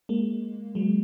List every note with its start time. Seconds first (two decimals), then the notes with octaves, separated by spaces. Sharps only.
0.09 G#3 A#3
0.75 F#3 G#3